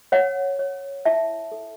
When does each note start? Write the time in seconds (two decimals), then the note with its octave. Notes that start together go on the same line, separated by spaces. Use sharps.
0.12 C#5 F#5
0.59 C#5
1.05 E4 E5 A5
1.52 A4